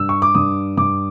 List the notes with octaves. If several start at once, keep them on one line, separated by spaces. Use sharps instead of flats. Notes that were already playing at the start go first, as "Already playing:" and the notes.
Already playing: G2 E6
C#6
D6
G2 D#6
G2 D6